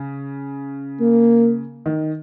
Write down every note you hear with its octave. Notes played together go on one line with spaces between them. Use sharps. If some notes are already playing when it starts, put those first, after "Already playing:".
Already playing: C#3
A#3
D#3